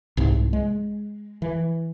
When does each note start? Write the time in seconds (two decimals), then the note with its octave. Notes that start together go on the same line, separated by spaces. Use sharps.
0.17 C2 G#2
0.53 G#3
1.42 E3